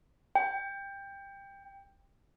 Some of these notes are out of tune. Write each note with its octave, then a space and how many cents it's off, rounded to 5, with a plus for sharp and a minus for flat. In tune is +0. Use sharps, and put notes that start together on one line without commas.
G5 +15